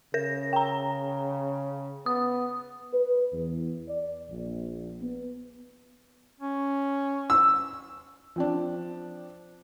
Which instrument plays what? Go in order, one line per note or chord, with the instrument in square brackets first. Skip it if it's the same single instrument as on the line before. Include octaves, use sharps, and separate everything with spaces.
[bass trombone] C#3 [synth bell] A#4 A#6
[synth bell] G5 A#5
[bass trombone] B3 [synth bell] D#6
[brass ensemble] B4
E2
D5
A#1
B3
[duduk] C#4
[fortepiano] E6
[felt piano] F3 C4 D4